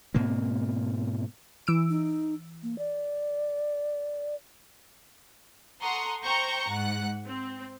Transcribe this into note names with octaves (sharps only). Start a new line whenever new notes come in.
G#2 B2 A#3 C4
E3 E6 D7
D#4
A#3
D5
A4 F#5 A#5 C6 C#6 D#6
C5 G5 A#5 C#6 G6 A#6
G#2 F#5 F#6
C4